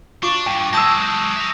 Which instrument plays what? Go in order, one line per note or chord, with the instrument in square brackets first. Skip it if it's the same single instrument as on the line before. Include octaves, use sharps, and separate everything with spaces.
[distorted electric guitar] D4 [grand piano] F4 [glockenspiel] C#6 D6
[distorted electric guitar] G2 [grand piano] G5
[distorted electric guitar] F#3 G#3 [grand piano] A5 E6 [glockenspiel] D#6 G6 A#6
[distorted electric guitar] E5 A#5